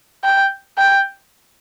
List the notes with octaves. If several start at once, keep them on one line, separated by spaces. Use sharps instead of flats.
G5
G5